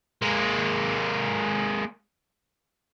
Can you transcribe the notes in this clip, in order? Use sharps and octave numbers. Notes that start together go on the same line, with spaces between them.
G#3 A#3